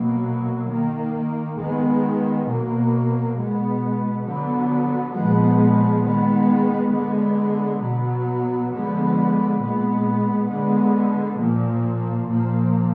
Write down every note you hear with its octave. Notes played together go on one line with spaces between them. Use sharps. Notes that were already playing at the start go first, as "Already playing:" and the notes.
Already playing: B2 F#3 A#3
D#3 A#3
D#3 G#3 B3
B2 F#3 A#3
B2 G#3 B3
D3 F#3 B3
A#2 F3 G#3 B3
D#3 G#3 B3
D3 G#3 B3
B2 F#3 B3
D3 F3 G#3 B3
A#2 G#3 B3
D3 G#3 B3
A#2 F3 A#3
A#2 F3 A#3